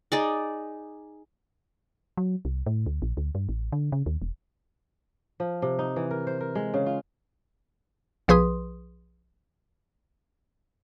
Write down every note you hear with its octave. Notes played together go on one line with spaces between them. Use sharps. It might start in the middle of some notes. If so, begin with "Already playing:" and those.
D#4 G#4 D5
F#3
C2
A2
D2
A#1
D2
G2
A1
D3
C#3
D#2
E1
F3
C3
D#4
E3
A#4
C5
A#4
G#3
C#3
F4
B1 F3 G#4 B4 C6 D#6